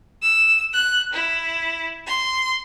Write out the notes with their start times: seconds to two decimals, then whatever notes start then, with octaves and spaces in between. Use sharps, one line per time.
0.22 E6
0.73 F#6
1.13 E4
2.06 C6